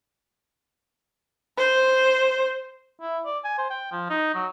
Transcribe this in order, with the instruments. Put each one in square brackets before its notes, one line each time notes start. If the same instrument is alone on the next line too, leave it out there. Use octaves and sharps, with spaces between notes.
[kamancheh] C5
[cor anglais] E4
D5
G#5
C5
G5
F3
D#4
F#3